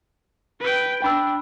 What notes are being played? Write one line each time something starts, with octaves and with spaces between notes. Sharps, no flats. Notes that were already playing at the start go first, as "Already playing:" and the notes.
B4 G5
D4 G5 B5 E6